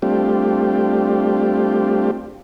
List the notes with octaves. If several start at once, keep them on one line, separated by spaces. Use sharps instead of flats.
G3 A3 C4 D4 F4 G4